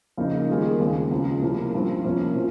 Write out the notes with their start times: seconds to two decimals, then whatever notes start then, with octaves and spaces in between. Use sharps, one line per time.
0.17 F2 C#3 F3 A#3 D#4
0.48 D#3 G3 A#3 F4 G#4
0.79 D#2 C#3 G#3 C4
1.11 C#2 C#3 F3
1.42 C2 C3 F3 A#3 C#4
1.74 G2 F3 C4
2.04 F2 C3 F3 A#3 C#4
2.35 C3 F3